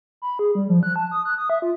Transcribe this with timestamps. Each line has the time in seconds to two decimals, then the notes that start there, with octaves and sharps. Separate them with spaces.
0.22 B5
0.39 G#4
0.55 G3
0.69 F3
0.83 F#6
0.96 A5
1.11 D#6
1.25 F#6
1.38 D#6
1.50 E5
1.62 F4